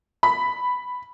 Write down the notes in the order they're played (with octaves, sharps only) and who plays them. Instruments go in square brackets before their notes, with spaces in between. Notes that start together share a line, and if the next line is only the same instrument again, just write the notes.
[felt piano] B5